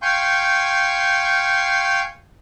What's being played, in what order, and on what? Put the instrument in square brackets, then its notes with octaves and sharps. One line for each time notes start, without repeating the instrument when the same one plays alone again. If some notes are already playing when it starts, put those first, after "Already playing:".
[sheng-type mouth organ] F5 G5 G#5 C6 C#6 G6